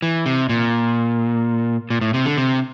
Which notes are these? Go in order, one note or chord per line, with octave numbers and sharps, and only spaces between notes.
E3
C3
A#2
A#2
A2
C3
D3
C3